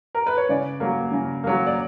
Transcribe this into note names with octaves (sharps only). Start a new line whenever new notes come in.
A#4
B4
C#5
C#3 D5
F#3 A#3
C#3
F#3 A#3
D5